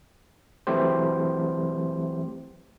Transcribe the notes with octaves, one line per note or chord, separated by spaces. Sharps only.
E3 F#3 A3 C4 G4 C5